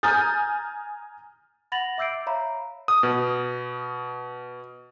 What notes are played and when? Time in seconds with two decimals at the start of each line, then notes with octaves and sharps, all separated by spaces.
0.03 G#5 A#5 D#6 F6 G6 A6
1.72 F#5 B5 A6 A#6 F7 F#7
1.98 E5 D6 E6 G6 C7 D7
2.27 C#5 E5 F5 A#5 B5
2.88 D#6
3.03 B2